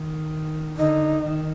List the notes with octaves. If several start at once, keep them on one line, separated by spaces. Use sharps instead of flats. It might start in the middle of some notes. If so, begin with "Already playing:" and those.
Already playing: D#3
D3 D#4
D#3